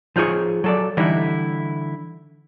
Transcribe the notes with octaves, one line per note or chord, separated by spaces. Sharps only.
F3 D#4 F4 G#4 C#5
F#3 A4 D5
D3 E3 G3 D#4 E4